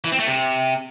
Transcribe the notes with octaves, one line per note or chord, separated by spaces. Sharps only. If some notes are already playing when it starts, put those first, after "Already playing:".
E3
C4
A3
C3